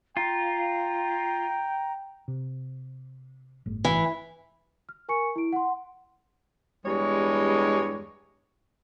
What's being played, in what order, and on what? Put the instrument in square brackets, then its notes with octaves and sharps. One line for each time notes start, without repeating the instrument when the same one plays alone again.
[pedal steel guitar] F4 [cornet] G5 [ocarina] A#5
[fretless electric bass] C3
G1 A2
[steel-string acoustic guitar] E3
[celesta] F6
A#4 G#5 C#6 C#7
E4 D7
F#5 C6
[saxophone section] E2 G2 G3 G#3 C#5